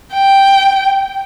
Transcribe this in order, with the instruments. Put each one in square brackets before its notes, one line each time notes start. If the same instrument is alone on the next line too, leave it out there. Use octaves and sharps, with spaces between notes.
[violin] G5